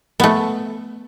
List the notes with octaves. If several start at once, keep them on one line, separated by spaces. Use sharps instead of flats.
A3 B3